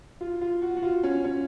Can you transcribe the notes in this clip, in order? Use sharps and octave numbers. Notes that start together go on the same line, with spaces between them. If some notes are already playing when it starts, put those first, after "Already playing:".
F4
F4
F#4
F#4
F4
C#4
C#4